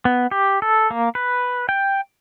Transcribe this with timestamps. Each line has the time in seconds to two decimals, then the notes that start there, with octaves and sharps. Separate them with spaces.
0.05 B3
0.31 G4
0.62 A4
0.91 A#3
1.15 B4
1.69 G5